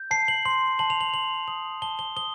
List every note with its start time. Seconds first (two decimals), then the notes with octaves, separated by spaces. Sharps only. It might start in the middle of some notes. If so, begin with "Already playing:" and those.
Already playing: G6
0.11 A5 C7
0.28 F#7
0.45 C6 F#7
0.79 A5 F#7
0.90 F7
1.01 F#7
1.14 C6 F#7
1.48 D#6 F#7
1.82 A5 G7
1.99 G7
2.16 D#6 G7